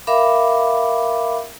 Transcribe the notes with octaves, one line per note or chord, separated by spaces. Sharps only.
A#4 E5 F5 B5 D6